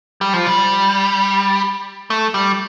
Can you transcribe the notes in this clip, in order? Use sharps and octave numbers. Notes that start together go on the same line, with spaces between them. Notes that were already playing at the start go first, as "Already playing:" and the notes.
G3
F3
G3
A3
G3